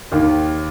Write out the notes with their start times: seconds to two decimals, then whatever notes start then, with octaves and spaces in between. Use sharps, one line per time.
0.12 D#2 D#3